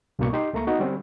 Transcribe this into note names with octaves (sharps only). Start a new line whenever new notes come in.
C2 G2 B2 A#3 D5 C#6
D#4 G4 C6
C#2 A3 A#3 A#5 C#6
B3 D#4 F#4
D3 G3 C4 C#4